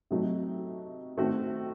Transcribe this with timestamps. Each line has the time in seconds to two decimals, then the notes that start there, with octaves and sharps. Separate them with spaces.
0.11 C3 F#3 A3 D#4 F#4
1.18 D#3 A3 C4 F#4